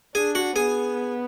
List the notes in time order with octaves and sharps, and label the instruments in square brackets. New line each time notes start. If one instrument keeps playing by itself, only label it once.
[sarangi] D4 [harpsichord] G#4 G#5
[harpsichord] F#4 F#5
[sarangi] B3 [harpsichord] G#4 G#5